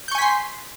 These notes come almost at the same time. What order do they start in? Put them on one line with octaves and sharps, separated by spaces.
G6 C#6 G#5 B6 C6